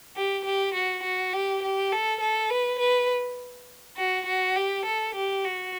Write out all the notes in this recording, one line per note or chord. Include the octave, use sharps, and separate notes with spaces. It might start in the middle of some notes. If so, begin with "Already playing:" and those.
G4
G4
F#4
F#4
G4
G4
A4
A4
B4
B4
F#4
F#4
G4
A4
G4
F#4